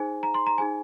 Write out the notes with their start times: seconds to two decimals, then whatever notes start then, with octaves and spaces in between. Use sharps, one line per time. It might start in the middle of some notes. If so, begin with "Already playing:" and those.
Already playing: D#4 G#4 C5 G#5
0.23 A#5
0.34 C6
0.47 A#5
0.58 D#4 G#4 C5 G#5